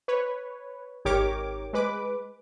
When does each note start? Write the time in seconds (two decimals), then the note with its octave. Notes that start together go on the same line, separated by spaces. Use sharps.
0.08 B4 C#5
1.05 G#1 D#3 G4 A#4 C#5 D6
1.73 G#3 B4 D6